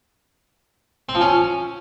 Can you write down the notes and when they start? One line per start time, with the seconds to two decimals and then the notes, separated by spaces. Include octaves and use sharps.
1.09 C4
1.15 F3
1.21 C#4